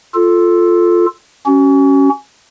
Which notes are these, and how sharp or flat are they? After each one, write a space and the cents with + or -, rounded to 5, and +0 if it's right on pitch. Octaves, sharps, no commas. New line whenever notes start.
F4 +0 A4 +0
C#4 +0 F#4 +35